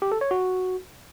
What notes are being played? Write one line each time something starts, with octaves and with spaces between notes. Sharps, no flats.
G4
A4
C#5
F#4